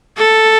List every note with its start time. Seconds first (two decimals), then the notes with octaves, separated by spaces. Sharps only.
0.17 A4